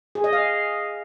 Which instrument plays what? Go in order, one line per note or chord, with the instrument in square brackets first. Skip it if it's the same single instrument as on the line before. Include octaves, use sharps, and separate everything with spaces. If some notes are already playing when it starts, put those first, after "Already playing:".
[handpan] G#4
D#5
F5